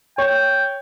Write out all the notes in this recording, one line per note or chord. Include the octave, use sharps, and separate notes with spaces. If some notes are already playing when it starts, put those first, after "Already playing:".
C#5 G5